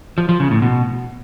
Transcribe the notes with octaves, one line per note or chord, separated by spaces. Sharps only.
F3
F3
C#3
A2
B2